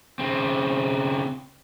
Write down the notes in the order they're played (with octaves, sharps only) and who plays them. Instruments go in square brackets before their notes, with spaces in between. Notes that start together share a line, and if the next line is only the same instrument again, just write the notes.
[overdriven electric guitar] C#3 C4